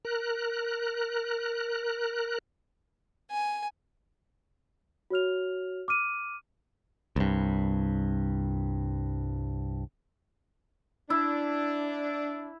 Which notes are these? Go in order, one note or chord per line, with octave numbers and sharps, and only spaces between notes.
A#4 F#6
G#5
F#4 C#5 F6 F7
D6 F6 D#7
C2 G2
D4 E4